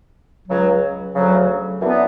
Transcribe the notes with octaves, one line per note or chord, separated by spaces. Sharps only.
C#2 C#3 F#3
D2 C#3 F#3
F#2 E3 B3 D4